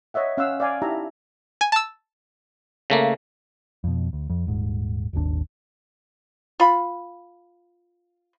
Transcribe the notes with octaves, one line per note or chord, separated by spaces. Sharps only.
C#5 D#5 E5 F#5
C#4 F5 F#5 E6
D5 F5 G#5 D6
D#4 E4 G4 E5 A5 A#5
G#5
A5 E6
C#3 A3 A#3
F2 B2
D2
F2
D#1 G#2
D#1 G#1 D#2 D4
F4 B5